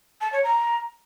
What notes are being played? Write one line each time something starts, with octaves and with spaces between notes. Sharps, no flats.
A5
C#5
A#5